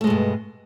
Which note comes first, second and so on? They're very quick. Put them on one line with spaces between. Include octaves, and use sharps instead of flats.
A3 G#3 B2 G2